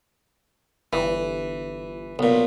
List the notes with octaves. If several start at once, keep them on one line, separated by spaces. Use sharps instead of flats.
G1 E3
B1 A#2